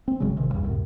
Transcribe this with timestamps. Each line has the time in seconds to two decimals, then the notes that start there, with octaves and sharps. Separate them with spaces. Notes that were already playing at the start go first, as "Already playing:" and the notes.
0.08 C4
0.20 G#1 C#3 F#3 G#3
0.37 A1 C3 D#3
0.50 E2 G2
0.63 C#2 F#2 A2 C3